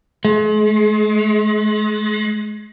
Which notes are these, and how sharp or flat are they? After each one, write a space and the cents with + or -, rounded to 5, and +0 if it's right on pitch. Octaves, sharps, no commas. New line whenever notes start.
G#3 +40